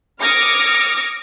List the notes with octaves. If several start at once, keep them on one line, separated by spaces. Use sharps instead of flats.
D6 D#6 F6 G#6 A#6 C#7